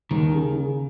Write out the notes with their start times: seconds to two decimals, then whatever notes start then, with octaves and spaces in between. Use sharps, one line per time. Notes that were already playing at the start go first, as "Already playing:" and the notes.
0.11 D#2 D#3
0.34 C#3
0.56 C#3